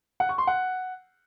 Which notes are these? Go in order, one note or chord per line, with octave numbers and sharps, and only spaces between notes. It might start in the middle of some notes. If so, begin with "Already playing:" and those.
F#5
C#6
C6
F#5